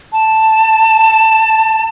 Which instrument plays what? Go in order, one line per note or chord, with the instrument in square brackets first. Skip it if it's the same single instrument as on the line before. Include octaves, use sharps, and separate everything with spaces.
[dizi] A5